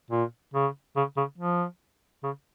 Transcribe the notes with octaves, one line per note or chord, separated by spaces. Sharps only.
A#2
C#3
C#3
C#3
F3
C#3